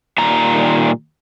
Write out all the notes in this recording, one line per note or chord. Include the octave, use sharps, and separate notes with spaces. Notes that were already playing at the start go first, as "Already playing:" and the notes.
A#2 D#3 G3 A#5